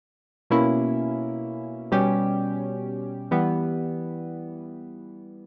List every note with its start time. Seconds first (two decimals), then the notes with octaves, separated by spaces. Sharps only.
0.50 B2 A#3 C#4 E4
1.91 B2 G3 C#4 G4
3.31 E3 G3 B3